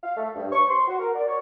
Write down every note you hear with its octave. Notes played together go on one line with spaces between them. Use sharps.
F5
A3
G2
C#6
C6
F#4
A#4
D5
C#5